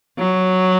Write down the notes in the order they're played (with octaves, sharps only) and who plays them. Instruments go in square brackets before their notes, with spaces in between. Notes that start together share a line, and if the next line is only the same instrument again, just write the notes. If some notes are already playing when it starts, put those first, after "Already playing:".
[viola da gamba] F#3